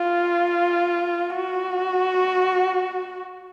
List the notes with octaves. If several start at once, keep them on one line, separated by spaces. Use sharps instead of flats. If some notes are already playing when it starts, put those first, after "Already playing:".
Already playing: F4
F#4